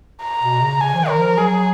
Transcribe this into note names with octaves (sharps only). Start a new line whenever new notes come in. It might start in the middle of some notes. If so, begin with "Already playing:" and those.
A#5
B2
C#3
C#3 G#5
F3
D#3
D#3 A#4
F3
F#3 G#4